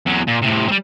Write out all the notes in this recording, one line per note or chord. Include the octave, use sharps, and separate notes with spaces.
E2 F#3
A#2
A2 C3
G3 C4